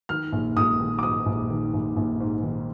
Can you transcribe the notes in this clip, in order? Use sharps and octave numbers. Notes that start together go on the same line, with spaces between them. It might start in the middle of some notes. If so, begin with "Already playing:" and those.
D#3 F6
A#1
A#1 D#6
D#3
D6
G#2 D#6
A#1
D#3
A#1
A#1
G#2
D#3